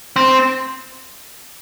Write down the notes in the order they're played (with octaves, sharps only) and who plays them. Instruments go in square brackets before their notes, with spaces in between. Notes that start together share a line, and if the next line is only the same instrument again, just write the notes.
[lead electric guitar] C4